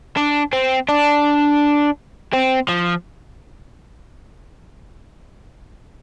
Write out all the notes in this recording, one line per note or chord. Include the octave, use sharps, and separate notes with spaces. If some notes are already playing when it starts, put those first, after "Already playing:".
D4
C4
D4
C4
F3